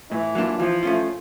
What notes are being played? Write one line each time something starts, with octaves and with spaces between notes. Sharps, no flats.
A2 E3
F#3 A#3 D4 F4
E3 F3
A3 C#4 F4